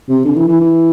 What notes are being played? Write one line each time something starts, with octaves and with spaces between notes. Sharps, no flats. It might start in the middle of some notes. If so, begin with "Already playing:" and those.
C3
D3
E3
E3
E3